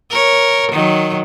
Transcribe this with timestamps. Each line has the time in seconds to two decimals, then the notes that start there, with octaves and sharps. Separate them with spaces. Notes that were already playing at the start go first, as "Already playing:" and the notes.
0.10 A#4 C#5
0.72 D#3 F#3